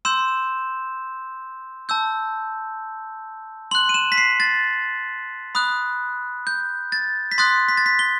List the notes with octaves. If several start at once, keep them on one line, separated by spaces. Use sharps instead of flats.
C6 E6 G6 E7
A5 E6 G6
C6 F#6 F#7
D#7
E7
B6
C7
A6
B5 D#6 F#6
G6
A6
B6
C6 D#6 F#6 A6
B6
A6
B6
G7